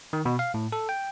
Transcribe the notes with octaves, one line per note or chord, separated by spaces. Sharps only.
D#3
B2
F5
A2
A4
G5